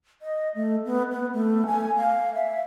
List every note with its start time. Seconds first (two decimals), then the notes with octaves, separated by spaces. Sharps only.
0.22 D#5
0.55 A3
0.85 B3
1.11 B3
1.34 A3
1.66 G#5
1.96 F5
2.35 E5